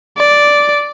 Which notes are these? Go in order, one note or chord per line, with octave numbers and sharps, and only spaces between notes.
D5